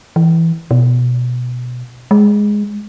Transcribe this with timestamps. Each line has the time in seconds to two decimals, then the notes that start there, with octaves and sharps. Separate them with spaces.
0.16 E3
0.71 B2
2.11 G#3